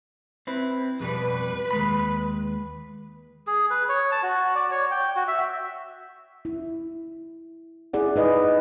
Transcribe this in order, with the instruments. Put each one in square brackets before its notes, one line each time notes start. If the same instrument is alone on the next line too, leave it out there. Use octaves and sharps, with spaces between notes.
[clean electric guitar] C4 E4 B4
[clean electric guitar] F2 B2 G3 [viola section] B4
[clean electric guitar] D#2 G#3 B5
[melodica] G#4
B4
C#5
A5
F#4
D5
C#5
G5
F#4
E5
[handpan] E4
E4 G#4 D5 F#5
D#4 B4 D#5